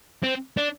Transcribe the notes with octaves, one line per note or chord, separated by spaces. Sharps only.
C4
D4